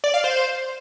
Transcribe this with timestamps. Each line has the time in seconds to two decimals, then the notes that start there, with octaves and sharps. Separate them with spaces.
0.04 D5
0.14 F5
0.24 C5